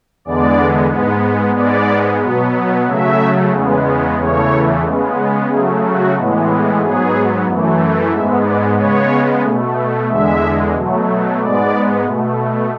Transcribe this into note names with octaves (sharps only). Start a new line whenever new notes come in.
E2 D3 G#3 B3 D5
G#2 G#3 B3
G#2 G#3 B3 D5
B2 F#3 B3
C#3 F#3 A3 E5
E2 C#3 G#3 B3
E2 C#3 E3 A3 C#5
C#3 G#3 B3
C#3 F#3 A3 G#4
F#4
A2 E3 G#3 B3
G#2 F#3 B3 G#4
F#2 E3 A3
G#2 G#3 B3 E5
D5
C#3 G#3 B3 C#5
B2 A3
E2 D3 G#3 E5
B2 F#3 A3
G#2 G#3 B3 D5
B2 A3